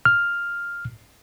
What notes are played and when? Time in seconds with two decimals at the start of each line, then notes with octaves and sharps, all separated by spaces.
0.05 F6